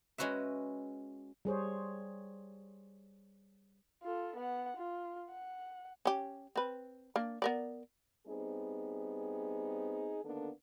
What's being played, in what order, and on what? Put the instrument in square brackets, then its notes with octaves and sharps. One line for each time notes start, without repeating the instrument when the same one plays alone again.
[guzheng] G#3 C#4 F#4 B4 E5
[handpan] G3 G#4 C5 C#5
[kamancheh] F4 A4
B3 F#5
F4
F#5
[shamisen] C#4 G4
C4 B4
A#3 D4
B3 A#4 D5
[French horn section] G3 B3 C4 D#4 G#4
D3 D#3 A#3 B3 D4 A4